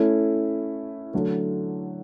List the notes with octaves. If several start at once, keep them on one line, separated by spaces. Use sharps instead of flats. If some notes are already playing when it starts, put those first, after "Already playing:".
Already playing: A3 C#4 E4
D3 F#3 A3